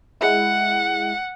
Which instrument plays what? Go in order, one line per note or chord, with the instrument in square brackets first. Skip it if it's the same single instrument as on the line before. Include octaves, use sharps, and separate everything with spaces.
[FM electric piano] G#3 E4 [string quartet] F#5